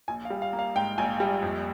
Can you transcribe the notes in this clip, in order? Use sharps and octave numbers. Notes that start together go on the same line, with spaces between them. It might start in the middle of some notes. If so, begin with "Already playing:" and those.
A#1 G#5
F5
G3
F5
A#3
F5
G#2 G5
A#1 G#5
G3
F2